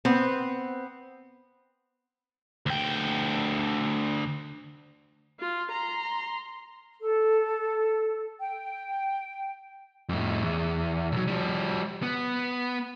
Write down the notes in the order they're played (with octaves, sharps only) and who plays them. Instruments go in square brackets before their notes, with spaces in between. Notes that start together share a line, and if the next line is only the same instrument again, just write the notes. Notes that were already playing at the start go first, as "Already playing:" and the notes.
[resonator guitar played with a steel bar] B3 C4
[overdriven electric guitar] D2 G5
[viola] F4
A#5 C6
[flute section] A4
G5
[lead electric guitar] F2 A2
E2
B1 F#3
F3 G3
B3